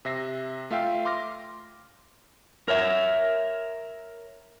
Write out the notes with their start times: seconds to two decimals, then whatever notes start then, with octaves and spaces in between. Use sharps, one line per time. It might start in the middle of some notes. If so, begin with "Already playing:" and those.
0.05 C3 E5 A#6 C7
0.71 A3 F4 E5 F5 G5
1.05 C6 D6 F6 A#6
2.68 A#4 C#5 E5